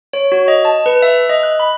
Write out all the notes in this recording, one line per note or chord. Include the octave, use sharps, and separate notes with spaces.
C#5
F#4
D#5
A5
B4
E5
D#5
F#6
B5